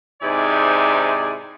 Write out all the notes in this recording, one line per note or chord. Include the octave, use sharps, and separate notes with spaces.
G#2 C3 D#4 E4 D5 G#5